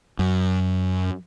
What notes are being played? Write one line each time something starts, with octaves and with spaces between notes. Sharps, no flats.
F#2